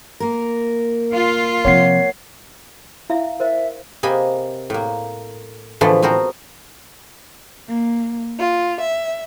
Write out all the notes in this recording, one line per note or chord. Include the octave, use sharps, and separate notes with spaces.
A#3 A#4
F4
C3 F3 C#5 F#5 C7
E4 E5 F5
A#4 C5 D#5 E5
C3 A#3 D#5 G#5 B5
A2 A#3
A2 D3 E3 F3 A3 B3
B3 C4 F#4 A#4 C5
A#3
F4
E5